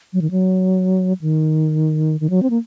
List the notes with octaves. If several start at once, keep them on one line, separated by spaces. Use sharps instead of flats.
F#3
D#3
F#3
D#3
D#3
F#3
C4
A#3